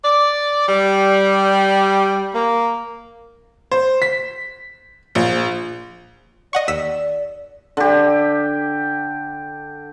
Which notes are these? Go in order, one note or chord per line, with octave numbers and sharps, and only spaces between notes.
D5
G3
A#3
C5
B6
A#1
D5 D#5 F#5 C#6
D#2 E6 B6
D3 G4